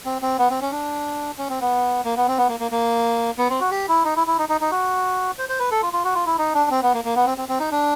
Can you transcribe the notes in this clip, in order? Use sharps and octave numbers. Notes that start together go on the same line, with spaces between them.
C4
C4
B3
C4
C#4
D4
C#4
C4
B3
A#3
B3
C4
B3
A#3
A#3
A#3
B3
C4
F#4
G4
E4
D#4
E4
E4
D#4
D#4
D#4
F#4
C5
C5
B4
A4
F4
F4
F#4
F4
E4
D#4
D4
C4
B3
A#3
A#3
B3
C4
C4
C4
D#4
D4